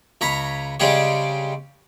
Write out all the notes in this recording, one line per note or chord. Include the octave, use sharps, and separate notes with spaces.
C#2 C#5 A#5 B5
C#3 G3 G#3 D4 G4 C#5